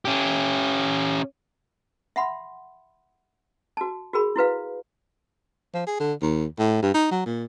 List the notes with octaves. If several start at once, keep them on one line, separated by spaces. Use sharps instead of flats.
C#4 G4
E5 F#5 B5 C6
F#4 A5
F#4 G#4 A#4 B5
E4 F#4 B4 F5
F3
G#4
D3
D#2
A2
G2
D#4
F#3
A#2